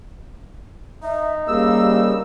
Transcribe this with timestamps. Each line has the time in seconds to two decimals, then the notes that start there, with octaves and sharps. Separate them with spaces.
1.03 D#4 E5
1.48 C#3 G3 A#3 G4 E6